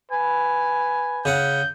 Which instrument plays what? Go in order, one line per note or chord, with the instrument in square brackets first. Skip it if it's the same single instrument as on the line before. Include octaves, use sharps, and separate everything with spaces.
[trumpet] B4 [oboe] G#5
[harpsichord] C#3 F#5 [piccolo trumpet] G6